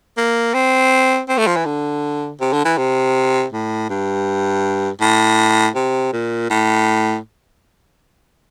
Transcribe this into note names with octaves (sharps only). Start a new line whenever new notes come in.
A#3
C4
C4
A3
F3
E3
D3
C3
D3
E3
C3
A2
G2
A2
C3
A#2
A2